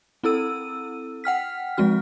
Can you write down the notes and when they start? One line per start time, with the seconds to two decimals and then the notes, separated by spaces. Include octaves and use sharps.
0.24 C4 E4 A4 E6 D#7
1.24 F#5 G5 F6 B6
1.77 F3 G#3 C4 F#4 F6